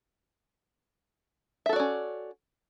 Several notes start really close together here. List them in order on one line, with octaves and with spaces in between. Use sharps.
E5 A4 F#4 D5 C#4